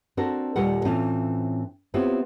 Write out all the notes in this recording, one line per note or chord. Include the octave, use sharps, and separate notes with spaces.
C4 D4 F#4 A4 A#4
D#2 A#2 G3 F4 A4 F#5
A2 E3 C4 C#4 F4
B3 C4 E4 F4 G4 C#5